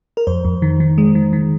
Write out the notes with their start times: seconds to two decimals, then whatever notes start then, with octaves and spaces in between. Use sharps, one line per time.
0.17 A#4
0.27 F2 C5
0.45 F2
0.62 D#3
0.80 D#3
0.98 G#3
1.15 D#3
1.33 D#3